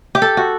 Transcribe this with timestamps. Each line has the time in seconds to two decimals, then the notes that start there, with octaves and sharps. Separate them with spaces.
0.15 G4
0.22 A4
0.37 F#4